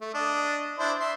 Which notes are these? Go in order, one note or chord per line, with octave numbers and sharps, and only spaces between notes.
A3
D4 D#5
D4 E4 C5
E5 C6